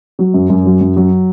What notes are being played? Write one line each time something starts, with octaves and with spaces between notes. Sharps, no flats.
F#3
F#2
F#2
F#3
F#2
F#3